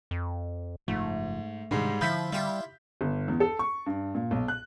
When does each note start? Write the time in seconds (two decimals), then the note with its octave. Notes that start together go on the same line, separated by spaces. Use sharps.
0.11 F2
0.88 F#1 C#2 G#2 F3 A3
1.71 G#2 C3 D#3 G3 G#3 D4
2.01 D3 F3 E4 F4 B5 G6 B6
2.32 G3 E4 F4 G4
3.01 G1
3.28 E2
3.40 A4
3.59 C#6
3.86 G2
4.15 A#2
4.31 B1
4.48 F#6